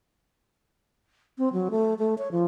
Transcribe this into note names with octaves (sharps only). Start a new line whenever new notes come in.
C4
F#3
A3
A3
C#5
F3